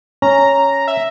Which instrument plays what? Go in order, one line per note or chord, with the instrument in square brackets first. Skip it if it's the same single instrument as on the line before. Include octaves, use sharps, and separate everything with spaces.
[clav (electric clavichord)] C#4 [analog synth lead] A#5
[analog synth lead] E5